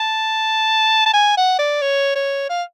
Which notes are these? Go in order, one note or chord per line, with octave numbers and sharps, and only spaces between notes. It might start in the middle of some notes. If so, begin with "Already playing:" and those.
Already playing: A5
A5
G#5
F#5
D5
C#5
C#5
F5